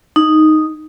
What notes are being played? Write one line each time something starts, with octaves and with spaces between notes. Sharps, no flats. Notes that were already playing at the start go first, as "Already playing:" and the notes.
D#4